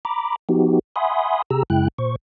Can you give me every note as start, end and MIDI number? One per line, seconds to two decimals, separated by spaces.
0.05 0.36 82
0.05 0.36 83
0.05 0.36 86
0.49 0.79 53
0.49 0.79 59
0.49 0.79 63
0.49 0.79 66
0.49 0.79 67
0.96 1.42 76
0.96 1.42 78
0.96 1.42 80
0.96 1.42 83
0.96 1.42 84
0.96 1.42 87
1.50 1.63 48
1.50 1.63 67
1.50 1.63 68
1.50 1.63 82
1.50 1.63 88
1.70 1.88 42
1.70 1.88 49
1.70 1.88 56
1.70 1.88 64
1.70 1.88 79
1.70 1.88 90
1.98 2.16 46
1.98 2.16 72
1.98 2.16 85